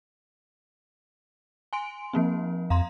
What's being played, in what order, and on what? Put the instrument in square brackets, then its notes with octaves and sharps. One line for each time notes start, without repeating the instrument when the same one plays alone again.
[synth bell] G#5 C6 D7
F3 A#3 C4
[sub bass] F2 [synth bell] F5 A#5 C6